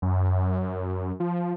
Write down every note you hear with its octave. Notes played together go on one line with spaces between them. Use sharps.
F#2
F3